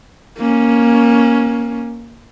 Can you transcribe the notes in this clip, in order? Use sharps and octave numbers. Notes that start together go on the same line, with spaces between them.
A#3 C#4